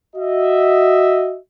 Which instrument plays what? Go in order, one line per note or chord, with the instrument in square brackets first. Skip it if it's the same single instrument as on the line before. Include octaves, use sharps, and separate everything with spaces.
[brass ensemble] F#4 D#5 E5